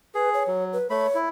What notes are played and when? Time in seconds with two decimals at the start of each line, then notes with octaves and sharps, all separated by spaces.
0.15 G#4 B4
0.34 C#5
0.47 F#3
0.73 B4
0.90 A3 C#5 B5
1.15 E4